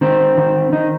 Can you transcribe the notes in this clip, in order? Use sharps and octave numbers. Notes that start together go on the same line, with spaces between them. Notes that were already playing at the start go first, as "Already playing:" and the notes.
D#3 C4
D#3
D#3 D#4